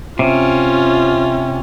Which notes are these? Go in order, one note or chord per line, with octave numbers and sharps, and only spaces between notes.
C3 C#4 F4